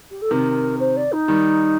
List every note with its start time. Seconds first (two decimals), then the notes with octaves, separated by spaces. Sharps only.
0.10 G4
0.21 A4
0.31 C3 D#3 A#4
0.80 C5
0.96 D5
1.12 D#4
1.28 D#3 G3